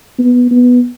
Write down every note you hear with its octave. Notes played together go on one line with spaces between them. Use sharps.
B3
B3